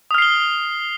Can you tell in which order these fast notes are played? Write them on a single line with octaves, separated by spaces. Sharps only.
D#6 F6 C7 G7